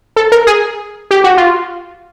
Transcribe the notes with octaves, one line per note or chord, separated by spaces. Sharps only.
A4
A#4
G#4
G4
F#4
F4